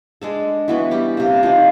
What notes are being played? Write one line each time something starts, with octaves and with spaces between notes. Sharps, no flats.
G#3 D4 A4
E3 B3 F#4
G3 G4
C3 A#3
F3 D#4